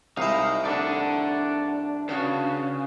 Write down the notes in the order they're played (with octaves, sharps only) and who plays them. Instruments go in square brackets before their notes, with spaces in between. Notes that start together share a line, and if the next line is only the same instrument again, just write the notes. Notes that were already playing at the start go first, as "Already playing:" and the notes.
[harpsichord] C2 E4 [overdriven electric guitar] D#4 [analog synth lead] F5
[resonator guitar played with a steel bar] A3 D#4 [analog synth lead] D4 [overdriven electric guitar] D5 F#5
[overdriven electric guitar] C#3 [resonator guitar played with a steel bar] B3 D4 F#4